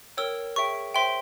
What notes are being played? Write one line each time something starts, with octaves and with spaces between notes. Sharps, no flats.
A#4 C#5 G5 E6
G#4 C#5 E5 G5 C#6
C5 E5 G5 C6